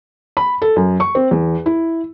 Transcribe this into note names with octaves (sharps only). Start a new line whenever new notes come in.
B5
A4
F#2
C#6
C4
E2
E4